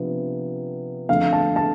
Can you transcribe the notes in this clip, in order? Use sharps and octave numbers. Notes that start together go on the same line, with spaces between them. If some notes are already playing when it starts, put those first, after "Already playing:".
Already playing: C3 F3 B3 D4
F2 D3 A3 F5
A5
A5